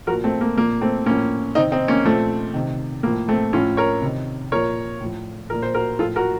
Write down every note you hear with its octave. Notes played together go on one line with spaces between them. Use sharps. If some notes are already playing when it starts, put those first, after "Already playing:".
A#2 F3 F#4 A#4
A3 C4
A#3
A#2 F3 A#3
A3 C4
A2 F3 A#3 C#4
C3 D#3 C4 D#4
C4 D#4
A#3 C#4
A#2 F3 A3 C4
C3 D#3
A2 F3 A#3
A3 C4
A2 F3 C#4 F4
A#4 C#5
C3 D#3
A#2 F3 A#4 C#5
A2 F3
A#2 F3 A#4
C5
F#4 A#4
A2 F3 F4 A4
F#4 A#4